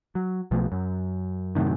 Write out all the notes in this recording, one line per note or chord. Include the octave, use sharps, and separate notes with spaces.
F#3
B1 B2 F3 A3
F#2
F#2 A2 C3 D#3